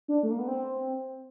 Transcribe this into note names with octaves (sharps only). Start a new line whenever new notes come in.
D4
A3
A#3
B3
C4